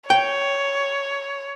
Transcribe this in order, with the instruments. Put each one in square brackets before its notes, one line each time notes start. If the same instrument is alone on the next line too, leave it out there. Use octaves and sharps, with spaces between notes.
[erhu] C#5 [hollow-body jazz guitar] G5